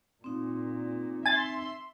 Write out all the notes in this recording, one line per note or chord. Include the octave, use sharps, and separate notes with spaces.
A#2 C4 D#4
E5 G#5 C6 A6